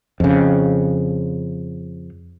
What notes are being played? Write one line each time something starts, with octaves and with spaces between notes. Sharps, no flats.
F2 C#3